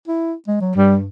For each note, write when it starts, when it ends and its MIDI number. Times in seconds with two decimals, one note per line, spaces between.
0.08 0.33 64
0.47 0.57 56
0.61 0.75 54
0.76 1.08 43
0.76 0.97 55